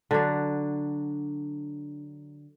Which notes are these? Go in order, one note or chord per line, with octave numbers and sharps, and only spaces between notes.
D3 F#3 D4